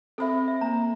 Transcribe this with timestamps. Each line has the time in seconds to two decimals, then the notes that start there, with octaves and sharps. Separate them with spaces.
0.18 C4 A4 C5 E5 B5
0.48 E5
0.61 A#3 A#5